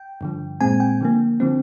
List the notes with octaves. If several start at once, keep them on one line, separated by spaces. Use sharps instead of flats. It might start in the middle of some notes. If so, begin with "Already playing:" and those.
Already playing: G5
G2 D3 F3
A#2 G#3 C4 G#5
G5
D3 F3 A#3
D3 F3 C4